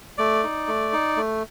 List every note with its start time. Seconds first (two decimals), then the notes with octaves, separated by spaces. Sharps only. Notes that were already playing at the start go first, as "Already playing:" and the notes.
0.18 A3 D5
0.44 D#4
0.68 A3
0.93 D#4
1.17 A3